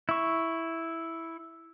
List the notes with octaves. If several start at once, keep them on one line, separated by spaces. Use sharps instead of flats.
E4 C#6